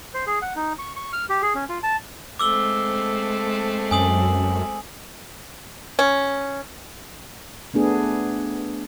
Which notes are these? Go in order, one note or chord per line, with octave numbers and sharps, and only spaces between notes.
C5
G#4
F#5
D#4
C#6
C#6
F6
G4
G#4
C#4
F4
A5
G#3 A3 C4 D6 E6 G7
F#2 G#5 D#6 F#7
C#4
A3 B3 D4 G#4